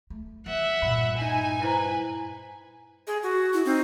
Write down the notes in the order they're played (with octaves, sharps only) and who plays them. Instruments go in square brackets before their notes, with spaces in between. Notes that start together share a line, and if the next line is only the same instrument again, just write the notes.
[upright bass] A3
[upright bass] E3 [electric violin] E5 F#5
[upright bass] G2 A#2 [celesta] B5
[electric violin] D#4 [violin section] G#5
[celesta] E4 C5 A#5 [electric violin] B4
[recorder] G#4
F#4
[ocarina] E4
[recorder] C4 [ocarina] D#4